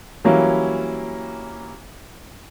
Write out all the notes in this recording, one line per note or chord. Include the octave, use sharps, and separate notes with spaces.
E3 F#3 G3 A#3 C#4 E4